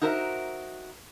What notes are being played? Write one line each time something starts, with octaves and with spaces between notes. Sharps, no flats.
D#4 F#4 A#4 C5 E5